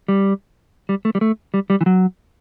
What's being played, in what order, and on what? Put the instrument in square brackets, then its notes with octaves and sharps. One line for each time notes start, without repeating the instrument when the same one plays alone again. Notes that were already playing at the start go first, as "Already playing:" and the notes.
[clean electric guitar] G3
G3
A3
G3
A3
G3
G3
E3
F#3